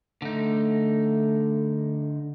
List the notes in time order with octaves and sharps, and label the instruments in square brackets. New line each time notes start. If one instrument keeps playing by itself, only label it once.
[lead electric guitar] D3 D#4 [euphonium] A3